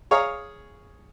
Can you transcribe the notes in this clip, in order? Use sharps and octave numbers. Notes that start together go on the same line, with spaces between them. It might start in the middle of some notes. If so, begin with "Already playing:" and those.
G#4 C#5 F5 A#5 C#6 D#6